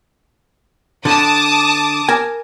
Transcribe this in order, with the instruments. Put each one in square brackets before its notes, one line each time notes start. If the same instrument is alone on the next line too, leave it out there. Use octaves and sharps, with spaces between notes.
[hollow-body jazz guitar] D3 [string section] A5 D6 D#6
[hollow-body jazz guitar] A#4 G#5